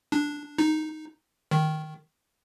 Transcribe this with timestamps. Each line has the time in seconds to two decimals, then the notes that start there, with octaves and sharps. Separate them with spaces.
0.12 D4
0.58 D#4
1.51 D#3